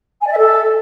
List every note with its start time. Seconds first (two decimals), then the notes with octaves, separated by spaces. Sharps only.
0.21 G#5
0.26 D5
0.32 E5
0.37 A4